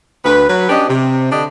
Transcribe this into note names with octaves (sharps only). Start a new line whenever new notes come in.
D2 B4
F#3 B4
C#4 D4 G4 D#5
C3
D3 D4 G4 D#5